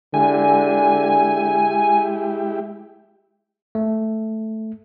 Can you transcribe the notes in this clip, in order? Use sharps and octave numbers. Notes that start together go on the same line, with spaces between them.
D3 G#3 E4 G4 G#5
A3